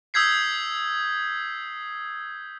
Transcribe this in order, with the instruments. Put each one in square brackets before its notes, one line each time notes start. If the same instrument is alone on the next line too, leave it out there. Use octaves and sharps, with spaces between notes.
[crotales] D#6 E6 G6 G#6 B6 C7